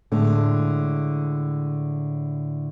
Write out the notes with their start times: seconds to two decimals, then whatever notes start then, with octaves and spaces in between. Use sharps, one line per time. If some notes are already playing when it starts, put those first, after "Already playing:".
0.12 A2 D3 G#3